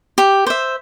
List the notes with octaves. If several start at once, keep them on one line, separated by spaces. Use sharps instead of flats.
G4
C5 E5